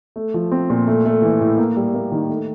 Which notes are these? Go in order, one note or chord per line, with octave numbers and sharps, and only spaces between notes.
A3
F3
C4
A#2
A3
A3
E3
A2
A#3
G3
A#3
D#3
A3